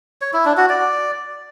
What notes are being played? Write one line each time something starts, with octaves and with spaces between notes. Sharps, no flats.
C#5
E4
D4
F#4
D5